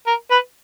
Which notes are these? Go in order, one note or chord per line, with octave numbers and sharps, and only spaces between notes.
A#4
B4